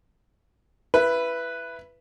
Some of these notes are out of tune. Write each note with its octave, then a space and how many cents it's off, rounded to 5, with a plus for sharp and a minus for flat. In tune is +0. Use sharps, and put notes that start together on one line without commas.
E4 +20 B4 +0